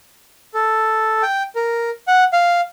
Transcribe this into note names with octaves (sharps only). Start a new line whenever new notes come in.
A4
G5
A#4
F#5
F5